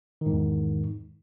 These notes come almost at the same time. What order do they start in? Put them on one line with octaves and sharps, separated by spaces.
D#3 G#2 E2